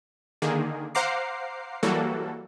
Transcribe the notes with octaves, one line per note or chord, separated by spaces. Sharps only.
D3 D#3 A#3 G#4
C5 F5 F#5 A#5 D6 C7
E3 F#3 G3 A#3 F#4 A4